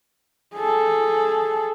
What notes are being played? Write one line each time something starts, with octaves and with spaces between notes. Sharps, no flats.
G#4 A4